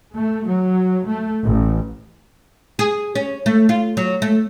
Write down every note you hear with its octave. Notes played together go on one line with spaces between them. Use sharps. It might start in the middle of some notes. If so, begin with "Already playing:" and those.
A3
F#3
A3
A1
G#4
C#4
A3
F4
F#3
A3